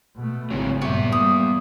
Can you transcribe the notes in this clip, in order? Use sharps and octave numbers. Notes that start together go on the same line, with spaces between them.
B2 A3
G#1 C#3 F#3 C4 E4
G2 A#2 B3 G4 C#5 E5
G3 A#3 D#6